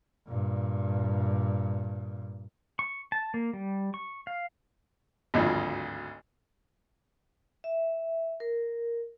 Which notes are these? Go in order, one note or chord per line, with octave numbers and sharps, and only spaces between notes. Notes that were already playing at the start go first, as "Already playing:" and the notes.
G2 A#2
C#6
A5
A#3
G3
C#6
F5
G#1 D2 G2 F3
E5
A#4